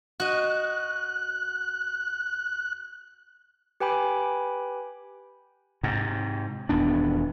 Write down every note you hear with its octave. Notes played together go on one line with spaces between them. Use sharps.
F#4 D#5 F#6
G4 B4 G5 G#5 B5 D6
G#2 C3
D#1 E2 B3 D4